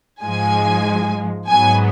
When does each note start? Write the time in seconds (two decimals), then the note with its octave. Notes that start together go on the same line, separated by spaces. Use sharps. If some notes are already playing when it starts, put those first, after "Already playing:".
0.22 G#2 F3 G#3 G#5
1.49 G#2 F#3 B3 G#5